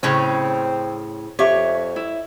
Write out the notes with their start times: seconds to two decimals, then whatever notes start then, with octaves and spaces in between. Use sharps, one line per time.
0.03 A2 C#3 C4 C#4
1.39 F2 G4 C#5 E5
1.96 E4